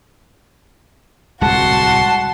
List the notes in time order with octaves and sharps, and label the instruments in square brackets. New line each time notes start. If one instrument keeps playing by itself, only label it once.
[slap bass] D1 C2 G#3 [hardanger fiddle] F#4 C6 [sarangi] F#5 [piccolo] A5